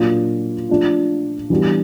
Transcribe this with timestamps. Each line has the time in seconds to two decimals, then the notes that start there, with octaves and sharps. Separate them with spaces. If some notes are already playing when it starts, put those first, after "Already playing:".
Already playing: A#2 F#3 A#3 D4 F4
0.69 F3 A3 D4 F4
1.50 E3 G3 B3 D4 F#4